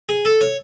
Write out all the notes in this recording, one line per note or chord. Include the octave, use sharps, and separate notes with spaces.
G#4
A4
C#5